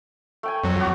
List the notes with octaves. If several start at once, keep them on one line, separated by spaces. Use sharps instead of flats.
A3 G5 G#5
F2 F#3
B3 F#4 D5